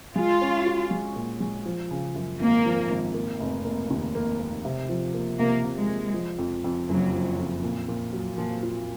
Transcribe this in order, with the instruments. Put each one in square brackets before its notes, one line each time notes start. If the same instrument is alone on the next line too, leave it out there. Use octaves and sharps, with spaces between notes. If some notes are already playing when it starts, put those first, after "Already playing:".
[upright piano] G#3 [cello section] F4
[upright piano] C#4
F#4
G#3
A#2
G#3
F3
C#3
F#2
[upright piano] G#1 [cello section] A#3
[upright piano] F3
G#1
A#3
F1
A#3
D#2
A#3
A#3
C3
F3
A#3
[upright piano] C3 [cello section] A#3
[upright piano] C3
[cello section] G#3
[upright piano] A#3
F3
F2
F2
[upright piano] F#1 [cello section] F#3
[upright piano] F3
F2
A#2
A#2
F#3
[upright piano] A#2 [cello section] F3
[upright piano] F4